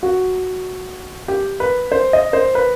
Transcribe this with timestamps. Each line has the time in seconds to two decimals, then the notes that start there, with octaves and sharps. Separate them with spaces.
0.03 F#4
1.28 G4
1.60 B4
1.92 C5
2.13 D#5
2.33 C5
2.55 B4